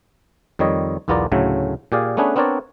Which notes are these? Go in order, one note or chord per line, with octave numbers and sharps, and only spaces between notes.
F2 D#3 G3 C#5 D#5
B1 E2 B3 F4 A#4 D5
D2 A2 C#3 F#3 A3
A#2 G4 G#4 D5 F5
A3 B3 C#4 D4 G#4 B4
B3 C4 D4 A#4 C#5 D5